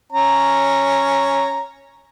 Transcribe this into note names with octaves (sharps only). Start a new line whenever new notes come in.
C#4 C#5 A#5